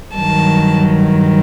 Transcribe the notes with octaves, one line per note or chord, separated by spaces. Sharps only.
G2 D#3 F#3 A5